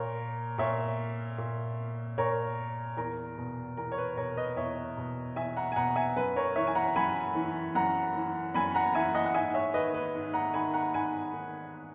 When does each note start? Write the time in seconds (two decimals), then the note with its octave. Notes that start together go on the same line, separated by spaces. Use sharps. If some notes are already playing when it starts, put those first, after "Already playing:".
Already playing: A#2 A#4 C#5
0.58 A#2 C#5 E5
1.38 A#2
2.18 A#2 A#4 C#5
2.97 E2 A#4
3.38 B2
3.77 E2 A#4
3.92 C#5
3.98 B4
4.17 B2 A#4 C#5
4.36 B4 D#5
4.56 E2 C#5 E5
4.97 B2
5.36 E2 E5 G#5
5.57 F#5 A#5
5.72 G#5
5.76 B2 F#5 A#5
5.96 E5 G#5
6.16 F#2 B4
6.36 A#4 C#5
6.56 E3 C#5 E5
6.67 G#5
6.75 F#5 A#5
6.96 F#2 G#5 B5
7.35 E3
7.75 F#2 F#5 A#5
8.15 E3
8.54 F#2 G#5 B5
8.75 F#5 A#5
8.95 E3 E5 G#5
9.15 D#5 F#5
9.26 F#5
9.34 G#2 E5 G#5
9.54 C#5 E5
9.74 D#3 B4 D#5
9.94 B4
10.15 G#2
10.34 F#5 A#5
10.54 D#3 G#5 B5
10.74 F#5 A#5
10.94 G#2 G#5 B5
11.34 D#3